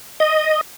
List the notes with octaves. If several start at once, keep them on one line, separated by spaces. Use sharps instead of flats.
D#5